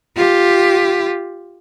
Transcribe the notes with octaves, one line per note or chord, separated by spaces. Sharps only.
F4 G4